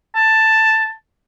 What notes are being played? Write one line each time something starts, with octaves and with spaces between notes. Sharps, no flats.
A5